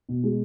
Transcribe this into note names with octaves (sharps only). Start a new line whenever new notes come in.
B2
G#3